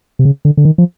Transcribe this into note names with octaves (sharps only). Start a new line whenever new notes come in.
C3
C#3
D3
D3
D#3
F3